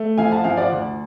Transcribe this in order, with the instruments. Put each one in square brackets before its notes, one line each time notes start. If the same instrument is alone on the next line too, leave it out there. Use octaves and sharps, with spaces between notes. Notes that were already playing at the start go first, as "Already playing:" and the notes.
Already playing: [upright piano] A3
F3 F5 G#5
F#5 A5
F3 F5 G#5
D5 F#5
D2